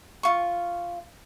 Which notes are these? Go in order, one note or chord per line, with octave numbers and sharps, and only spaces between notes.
F4 C#6